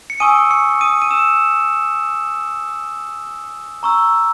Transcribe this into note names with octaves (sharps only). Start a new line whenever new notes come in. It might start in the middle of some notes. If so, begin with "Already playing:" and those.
C#7
G#5 C#6 D#6 E6 D#7
C#6 C#7
D#6 D#7
D#7
E6 E7
A#5 C#6 E6